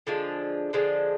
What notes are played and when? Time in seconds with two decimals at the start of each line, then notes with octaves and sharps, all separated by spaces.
0.07 D3 F3 G#3 D4
0.73 D3 F3 G#3 D4